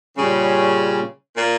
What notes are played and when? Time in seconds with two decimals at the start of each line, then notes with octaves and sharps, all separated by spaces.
0.17 A#2 C#3 G3 C#4
1.36 A#2